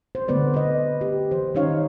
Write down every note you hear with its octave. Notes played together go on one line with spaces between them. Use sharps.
C5
D3 A3 B3 B4 D5
B4 D#5
G4
E3 C5
D#3 C#4 D#4 C#5 F5